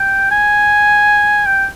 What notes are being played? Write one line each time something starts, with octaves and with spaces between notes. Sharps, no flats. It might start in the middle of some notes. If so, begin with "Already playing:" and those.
Already playing: G5
G#5
G5